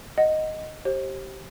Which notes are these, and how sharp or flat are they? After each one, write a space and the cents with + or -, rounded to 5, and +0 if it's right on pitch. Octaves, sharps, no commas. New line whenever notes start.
D#5 +0 F#5 +0
G4 -20 C5 +35